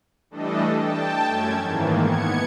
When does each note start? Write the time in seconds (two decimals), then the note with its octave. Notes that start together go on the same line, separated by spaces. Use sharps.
0.30 E3 G3 A3 D4 A4 D#5
0.75 G5 A5
1.27 F#2 A3 C#4 G#6
1.60 G#2 D#3 E3 A#3
2.03 B3 G#6 C#7